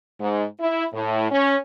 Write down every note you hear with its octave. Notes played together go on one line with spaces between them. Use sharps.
G#2
E4
A2
C#4